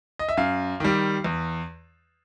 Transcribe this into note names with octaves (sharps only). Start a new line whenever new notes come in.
D#5
E5
F#2 F5
D#3 G3
E2